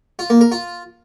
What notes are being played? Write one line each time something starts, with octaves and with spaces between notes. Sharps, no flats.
F4
A#3
A#4
F4